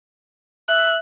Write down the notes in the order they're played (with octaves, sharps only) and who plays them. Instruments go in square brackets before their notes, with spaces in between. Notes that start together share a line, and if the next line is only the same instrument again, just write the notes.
[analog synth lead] E5 [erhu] F#6